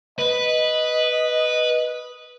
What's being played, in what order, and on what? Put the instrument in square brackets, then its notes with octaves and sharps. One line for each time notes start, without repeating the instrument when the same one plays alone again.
[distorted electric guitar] B4 [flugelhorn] D#5